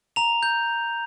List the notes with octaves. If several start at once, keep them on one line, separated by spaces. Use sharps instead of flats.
A#5 F7
G6